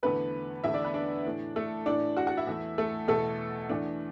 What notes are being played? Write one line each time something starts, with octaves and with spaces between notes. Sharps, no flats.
E2 D3 A3 B3 B4
E2 D3 A3 E4 E5
D4 D5
B3 B4
D4 D5
A2 E3 A3
A3 A4
A2 E3 A3 D4 D5
F#4 F#5
F#4 F#5
E4 E5
E2 E3 A3
A3 A4
E2 B2 A3 A4
E2 E3 A3 D4